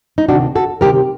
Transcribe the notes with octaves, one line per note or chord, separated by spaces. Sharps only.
D#4
D2 C3 D#3 D4 F#4
F#4 A4
D2 C3 D#3 G4 A#4